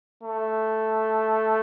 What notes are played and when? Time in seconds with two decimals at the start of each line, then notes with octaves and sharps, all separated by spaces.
0.23 A3